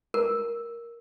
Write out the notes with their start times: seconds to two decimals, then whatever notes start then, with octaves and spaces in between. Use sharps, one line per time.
0.14 A#4